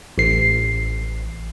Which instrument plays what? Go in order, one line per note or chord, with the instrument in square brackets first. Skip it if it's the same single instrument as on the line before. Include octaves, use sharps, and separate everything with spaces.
[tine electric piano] A1 C7